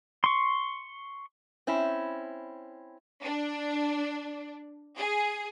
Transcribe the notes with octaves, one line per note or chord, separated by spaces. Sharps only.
C6 C#6
C4 C#4 E4
D4
G#4